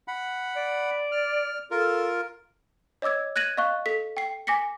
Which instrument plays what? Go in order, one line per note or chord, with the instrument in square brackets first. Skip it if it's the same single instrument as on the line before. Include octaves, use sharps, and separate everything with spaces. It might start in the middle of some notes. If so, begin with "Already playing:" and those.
[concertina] F#5 B5
[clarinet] D5
[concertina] F6
[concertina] F4 A#4 [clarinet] A4
[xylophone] C#5 D#5 D6 E6 G#6
F#6 G#6 A#6 D#7 F#7
D#5 F5 C#6 F#6
A4 B6
G5 C7
G#5 D6 A#6 B6 C#7